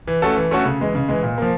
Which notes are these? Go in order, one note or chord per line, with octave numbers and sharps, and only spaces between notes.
E3
A3 C#4 F#4 A4
E3
A3 C#4 F#4 A4
C#3
E3 G#3
C#3
E3 G#3
A#2
F3 A#3